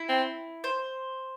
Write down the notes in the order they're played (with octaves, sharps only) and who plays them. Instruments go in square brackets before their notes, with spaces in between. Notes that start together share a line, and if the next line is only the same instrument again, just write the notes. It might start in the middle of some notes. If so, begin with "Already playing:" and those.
Already playing: [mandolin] E4
[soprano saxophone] C4
[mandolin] C5